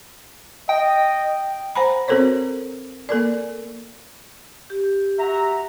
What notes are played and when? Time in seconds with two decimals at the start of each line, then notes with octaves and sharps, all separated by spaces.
0.69 D#5 G5
1.75 C5 F#5 G#5 A#5 B5
2.08 C4 F#4 A4 A#4 C5 C#5
3.09 A#3 A4 A#4 D5
4.70 G4
5.19 F#4 E5 A#5